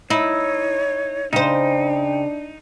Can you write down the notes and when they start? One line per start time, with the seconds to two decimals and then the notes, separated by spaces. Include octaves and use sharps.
0.10 D#4 E4 C#5
1.33 C#3 D4 D#4 C5 G5